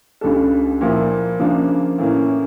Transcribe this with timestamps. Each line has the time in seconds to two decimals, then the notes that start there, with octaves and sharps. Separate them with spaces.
0.21 C#2 C#3 G3 D4 A4
0.81 A#2 F3 A#3 E4
1.40 C#3 F3 A#3 D4
1.98 A2 E3 A#3 C#4